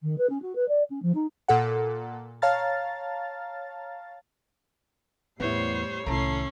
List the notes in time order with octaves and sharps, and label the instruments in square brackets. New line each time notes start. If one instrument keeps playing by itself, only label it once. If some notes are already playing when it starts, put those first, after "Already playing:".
[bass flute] D#3
B4
C#4
F#4
B4
D5
C#4
F3
D#4
[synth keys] A#2 A4 F#5
C#5 F5 A5 A#5 F6 A6
[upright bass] E2 [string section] A2 G3 C7 [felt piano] B3 E4 [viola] C5 C#5
[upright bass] C2 D#3 [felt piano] A2 A5 A#5 [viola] C#4 [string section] A4 C7